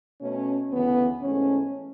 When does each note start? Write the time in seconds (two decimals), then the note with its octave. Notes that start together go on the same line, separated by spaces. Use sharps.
0.20 B2 A3 C#4
0.71 D2 C#3 E3 B3
1.22 G#2 E3 A3 C#4